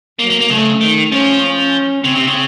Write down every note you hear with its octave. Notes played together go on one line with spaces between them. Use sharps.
F#3 A#3
A#3
A#3
C#3 A3
D#3
F3 C#4
C#4
C#3 C4
C3
C#3